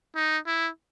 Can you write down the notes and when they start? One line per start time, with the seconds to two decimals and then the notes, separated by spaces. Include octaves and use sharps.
0.16 D#4
0.47 E4